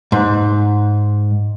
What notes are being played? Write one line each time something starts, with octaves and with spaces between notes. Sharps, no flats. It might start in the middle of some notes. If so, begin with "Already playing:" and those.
G#2